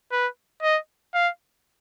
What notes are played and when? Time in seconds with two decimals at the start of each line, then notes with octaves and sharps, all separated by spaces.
0.12 B4
0.63 D#5
1.14 F5